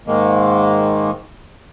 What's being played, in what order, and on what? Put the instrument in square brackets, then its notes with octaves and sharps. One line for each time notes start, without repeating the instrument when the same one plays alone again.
[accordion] G#2 D#3 G#3 A#3